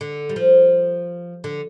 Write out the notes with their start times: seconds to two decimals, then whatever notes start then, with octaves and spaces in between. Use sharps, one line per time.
0.01 D3
0.29 G3
0.36 F3
1.44 D3